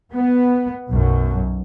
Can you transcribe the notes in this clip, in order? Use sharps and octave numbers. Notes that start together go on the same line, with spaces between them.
B3
B1 F#2